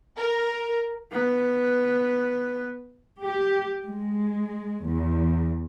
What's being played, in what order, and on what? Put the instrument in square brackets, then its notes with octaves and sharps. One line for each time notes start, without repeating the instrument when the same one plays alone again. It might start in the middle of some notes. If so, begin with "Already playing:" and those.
[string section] A#4
[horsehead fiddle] B3 B4
[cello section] G4
G#3
E2